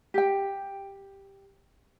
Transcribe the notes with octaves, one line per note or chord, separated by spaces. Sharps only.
G4 G5